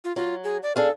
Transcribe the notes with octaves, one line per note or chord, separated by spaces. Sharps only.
F4
F#3 F4
G#4
D5
D4 G#4 A4 F5